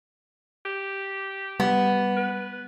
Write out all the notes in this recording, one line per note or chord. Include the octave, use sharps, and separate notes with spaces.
G4
G3 B3
B4